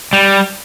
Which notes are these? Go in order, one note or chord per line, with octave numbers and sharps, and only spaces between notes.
G3